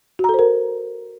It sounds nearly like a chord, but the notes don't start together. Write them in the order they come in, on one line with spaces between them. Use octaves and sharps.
F#4 A#5 A4 C5 A#4